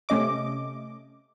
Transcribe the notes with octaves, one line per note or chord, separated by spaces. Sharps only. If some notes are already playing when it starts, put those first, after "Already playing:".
C3 A3 C#4 D#5 D6